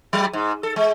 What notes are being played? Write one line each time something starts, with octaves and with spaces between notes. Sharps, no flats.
F#3
G#2
A4
G#3